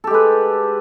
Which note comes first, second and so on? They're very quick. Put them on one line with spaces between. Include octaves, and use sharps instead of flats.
A4 G4 G#3 B4